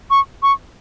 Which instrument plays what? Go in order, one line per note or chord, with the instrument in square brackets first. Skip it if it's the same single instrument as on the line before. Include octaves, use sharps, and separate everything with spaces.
[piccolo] C#6
C#6